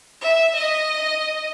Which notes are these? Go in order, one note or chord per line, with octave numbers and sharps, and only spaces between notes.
E5
D#5